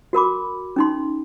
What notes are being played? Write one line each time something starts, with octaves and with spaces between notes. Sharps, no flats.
F#4 A#4 B5 D6
C#4 D#4 C6